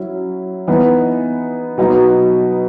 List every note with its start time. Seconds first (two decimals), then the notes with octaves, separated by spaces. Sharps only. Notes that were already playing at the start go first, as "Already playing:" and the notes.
Already playing: F#3 C#4 E4
0.67 E3 B3 D#4
1.78 B2 F#3 B3 D#4